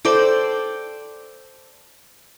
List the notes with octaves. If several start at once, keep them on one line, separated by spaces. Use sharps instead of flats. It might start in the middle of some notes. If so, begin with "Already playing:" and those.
A4 C5 D5 G5